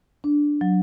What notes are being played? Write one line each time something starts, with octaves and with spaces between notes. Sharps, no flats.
D4
F#3